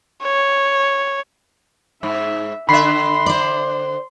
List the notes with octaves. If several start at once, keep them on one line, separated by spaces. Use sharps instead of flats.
C#5
G#2 E5
D3 E5 B5 C6 C7
C5 D5